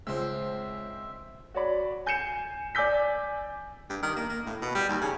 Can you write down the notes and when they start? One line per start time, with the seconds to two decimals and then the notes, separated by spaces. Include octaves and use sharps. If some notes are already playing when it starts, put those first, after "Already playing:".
0.07 C#2 G#3 C4 C5 E5 E6
1.54 F#4 C#5 D5 B5
2.06 G#5 G6 C7 C#7 E7
2.75 D5 G#5 D6 E6 G6 B6
3.90 G2
4.02 D#3
4.16 A#3
4.29 A#3
4.46 A2
4.62 B2
4.75 G3
4.89 D#2
5.02 C#3